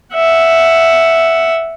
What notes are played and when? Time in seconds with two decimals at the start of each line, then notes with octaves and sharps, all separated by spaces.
0.14 E5 F#5